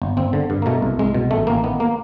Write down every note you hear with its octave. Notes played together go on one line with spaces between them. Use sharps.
G1
G1 C4
D3
G2
A#3
B2 A3
C2
C2 G#3
B2
A1 A3
A1 A#3
D#3 B3
A#3